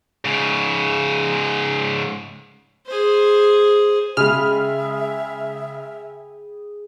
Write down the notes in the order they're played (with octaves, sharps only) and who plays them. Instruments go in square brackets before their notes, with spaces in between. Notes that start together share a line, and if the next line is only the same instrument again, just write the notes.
[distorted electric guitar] G#2 C#3
[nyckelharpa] G#4 C5
[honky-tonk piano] C#3 G#3 [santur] G#4 G5 B5 [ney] E5 [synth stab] F6